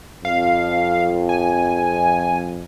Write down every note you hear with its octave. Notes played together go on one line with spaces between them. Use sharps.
F2 F5
G#5